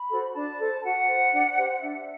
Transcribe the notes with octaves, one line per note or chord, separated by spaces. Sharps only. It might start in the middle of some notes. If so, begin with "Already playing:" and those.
Already playing: B5
F#4 A4 C5
D4 A5
A4 C5
F#4 F#5
C5
D4
G4 C5
F#5
D4 E5